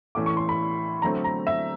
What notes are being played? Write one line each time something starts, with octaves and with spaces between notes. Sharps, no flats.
A2 E3 A3 C#4 D6
C#6
C6
B5
D3 F#3 A3 C4 A#5
A#5
E5